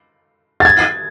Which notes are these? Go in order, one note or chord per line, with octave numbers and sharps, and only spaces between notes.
A6
G#6